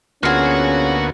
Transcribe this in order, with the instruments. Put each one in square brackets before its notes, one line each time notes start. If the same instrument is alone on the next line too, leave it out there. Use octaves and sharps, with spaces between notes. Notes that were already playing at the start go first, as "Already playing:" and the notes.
[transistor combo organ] D2 A#3 B3 [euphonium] C#4 [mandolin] F4 G#4 [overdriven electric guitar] F#4 F#5